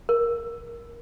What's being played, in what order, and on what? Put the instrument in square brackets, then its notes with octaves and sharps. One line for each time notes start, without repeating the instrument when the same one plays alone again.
[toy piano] A#4